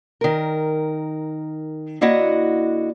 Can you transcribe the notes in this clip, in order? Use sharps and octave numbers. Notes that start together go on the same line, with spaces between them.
D#3 A#4
D3 A#3 E4 F#4 D#5 F#5